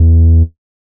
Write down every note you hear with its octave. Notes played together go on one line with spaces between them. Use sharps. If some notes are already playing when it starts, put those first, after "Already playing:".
Already playing: E2